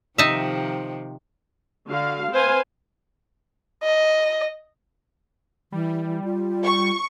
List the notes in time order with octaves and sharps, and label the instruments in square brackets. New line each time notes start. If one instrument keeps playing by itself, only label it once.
[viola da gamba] C3 D#3 F3 [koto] D#4 E5
[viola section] D3 F#4 F5
C4 B4 C5 F5 G#5
[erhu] D#5
[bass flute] E3 [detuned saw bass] G3
[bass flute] F4
[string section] C#6